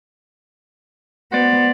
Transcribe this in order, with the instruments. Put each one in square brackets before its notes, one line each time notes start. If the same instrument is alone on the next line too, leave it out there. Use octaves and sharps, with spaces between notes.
[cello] B3 [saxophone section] F#4 C5 D5